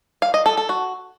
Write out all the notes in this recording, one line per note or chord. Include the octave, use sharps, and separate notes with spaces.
F5
D#5
A4
A4
F#4